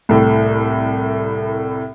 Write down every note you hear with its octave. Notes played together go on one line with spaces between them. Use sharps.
C2 A2